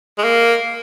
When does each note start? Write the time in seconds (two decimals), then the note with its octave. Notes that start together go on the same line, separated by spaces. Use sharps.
0.18 G#3
0.24 A#3